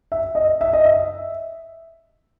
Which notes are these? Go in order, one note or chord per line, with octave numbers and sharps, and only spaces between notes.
E5
D#5
E5
D#5
E5